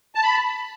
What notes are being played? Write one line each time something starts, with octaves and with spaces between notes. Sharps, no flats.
A5
B5